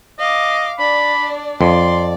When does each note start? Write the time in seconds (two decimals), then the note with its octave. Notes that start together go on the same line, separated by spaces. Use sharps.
0.19 D#5 F5 D6
0.79 D4 D5 B5
1.61 F2 D5 C6